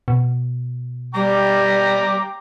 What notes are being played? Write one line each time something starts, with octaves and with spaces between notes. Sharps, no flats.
B2
G3 G5 A#5 D6